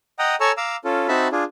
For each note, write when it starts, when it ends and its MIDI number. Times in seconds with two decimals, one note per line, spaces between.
0.19 0.35 75
0.19 0.35 78
0.19 0.35 79
0.19 0.35 82
0.19 0.35 87
0.40 0.52 69
0.40 0.52 73
0.40 0.52 80
0.40 0.52 82
0.40 0.52 85
0.40 0.52 88
0.57 0.76 77
0.57 0.76 82
0.57 0.76 86
0.57 0.76 88
0.85 1.07 61
0.85 1.07 65
0.85 1.07 69
1.08 1.28 60
1.08 1.28 63
1.08 1.28 66
1.08 1.28 76
1.08 1.28 81
1.08 1.28 83
1.32 1.44 62
1.32 1.44 65
1.32 1.44 68